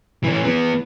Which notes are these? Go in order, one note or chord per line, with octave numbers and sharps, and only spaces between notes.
E3 C#4
E3 B3